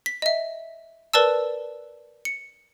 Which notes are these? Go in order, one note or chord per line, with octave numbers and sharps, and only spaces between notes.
B6
D#5 E5
A#4 B4 D5 A5 E6
C#7